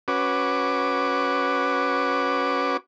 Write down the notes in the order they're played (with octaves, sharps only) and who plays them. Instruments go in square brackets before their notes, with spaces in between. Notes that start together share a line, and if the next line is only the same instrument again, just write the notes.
[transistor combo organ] C#4 F#4 B4 D6